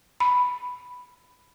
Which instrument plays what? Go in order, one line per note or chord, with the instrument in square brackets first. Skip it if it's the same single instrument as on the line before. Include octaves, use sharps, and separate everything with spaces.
[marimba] B5